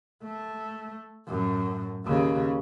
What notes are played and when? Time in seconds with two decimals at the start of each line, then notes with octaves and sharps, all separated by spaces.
0.23 A3
1.27 F#2 A2
2.06 D#2 C#3